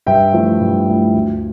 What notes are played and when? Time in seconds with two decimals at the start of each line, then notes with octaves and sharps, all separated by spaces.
0.07 G2 E5 G5
0.33 F3 A3 E4
0.60 G2
0.88 F3 A3 E4
1.14 D2